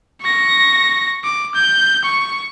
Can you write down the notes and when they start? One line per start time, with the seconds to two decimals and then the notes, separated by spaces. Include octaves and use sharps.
0.21 C#6 A#6
1.24 D6
1.55 G6
2.04 C#6